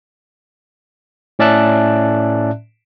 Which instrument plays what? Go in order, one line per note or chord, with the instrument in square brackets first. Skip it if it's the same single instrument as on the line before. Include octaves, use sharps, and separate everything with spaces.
[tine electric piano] A2 C#4 D5 E5 A5 F#6